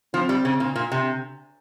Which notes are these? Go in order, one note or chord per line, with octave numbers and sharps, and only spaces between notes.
F3 C4
G3
C#3
A#2
A#2
C3